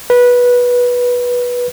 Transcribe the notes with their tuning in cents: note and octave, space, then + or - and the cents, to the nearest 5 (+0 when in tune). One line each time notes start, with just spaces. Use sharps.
B4 -15